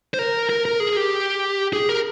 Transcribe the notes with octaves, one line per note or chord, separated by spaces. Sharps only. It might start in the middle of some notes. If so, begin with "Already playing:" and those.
C5
A#4
A#4
A#4
G#4
G4
G#4
A#4